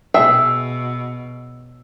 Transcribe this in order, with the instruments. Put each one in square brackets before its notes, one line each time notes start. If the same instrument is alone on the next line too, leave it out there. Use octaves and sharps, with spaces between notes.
[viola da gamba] B2 [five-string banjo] G#4 E5 G5 [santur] E6